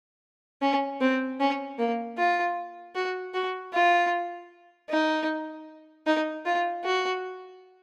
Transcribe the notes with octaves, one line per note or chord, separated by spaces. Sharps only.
C#4
C4
C#4
A#3
F4
F#4
F#4
F4
D#4
D#4
F4
F#4